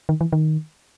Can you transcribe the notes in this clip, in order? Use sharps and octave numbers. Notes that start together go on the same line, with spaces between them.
D#3
E3
D#3